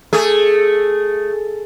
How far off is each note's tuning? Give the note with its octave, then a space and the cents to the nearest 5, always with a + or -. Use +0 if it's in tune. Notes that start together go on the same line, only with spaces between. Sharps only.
A3 +0 G#4 +0